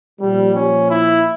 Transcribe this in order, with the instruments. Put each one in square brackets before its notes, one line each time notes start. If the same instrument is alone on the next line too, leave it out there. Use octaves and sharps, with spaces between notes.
[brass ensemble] A#2 F3 G3
C#4
E4